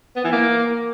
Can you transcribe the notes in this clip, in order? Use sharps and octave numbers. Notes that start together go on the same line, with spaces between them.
B3
E3
A#3